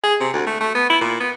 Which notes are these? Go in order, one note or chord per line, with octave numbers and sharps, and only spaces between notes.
G#4
C3
D2
A3
A3
B3
E4
A#2
B3